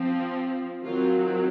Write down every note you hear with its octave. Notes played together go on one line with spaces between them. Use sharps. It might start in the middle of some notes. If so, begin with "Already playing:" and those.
Already playing: F3 C4
D#3 F#3 C4 F4